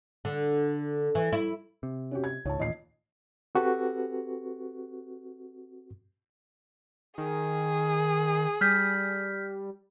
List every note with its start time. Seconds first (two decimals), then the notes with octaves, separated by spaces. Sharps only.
0.25 D3
1.15 E3
1.33 E4
1.83 C3
2.11 C#4 F#4 G4
2.24 G#6
2.45 C#2 G#2 C#5 A5
2.59 A1 D#2 A#2 D#5 C7
3.55 C4 F#4 G4 A4 B4
7.18 D#3 G#4
8.61 G3 F6 G6 B6